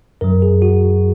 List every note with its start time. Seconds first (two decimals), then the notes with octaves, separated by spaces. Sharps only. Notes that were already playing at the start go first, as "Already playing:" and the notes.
0.21 F#2 F#3 A#4
0.42 G#4
0.62 F#4